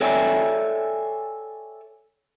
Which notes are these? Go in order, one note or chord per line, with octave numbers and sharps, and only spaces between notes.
A4 C#5 D5 E5 G5 G#5